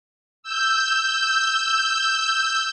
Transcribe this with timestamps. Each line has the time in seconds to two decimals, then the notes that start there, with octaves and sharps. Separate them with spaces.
0.43 E6 G6